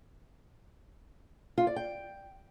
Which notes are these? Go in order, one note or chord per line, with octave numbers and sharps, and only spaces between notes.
F4
D5
G5